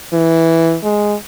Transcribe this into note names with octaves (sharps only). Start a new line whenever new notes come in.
E3
G#3